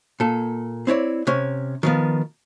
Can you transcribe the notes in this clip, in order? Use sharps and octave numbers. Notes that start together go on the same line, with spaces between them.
A#2 A4
C4 E4 C#5 D5
C3 C#4
D#3 F3 B3